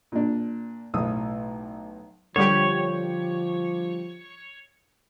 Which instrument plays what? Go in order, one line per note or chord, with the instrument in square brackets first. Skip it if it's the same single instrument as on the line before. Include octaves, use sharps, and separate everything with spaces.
[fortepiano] A#2 D4
B1 A2 D#6 E6
[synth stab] D3 G3 G4 [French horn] F3 [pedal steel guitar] C#5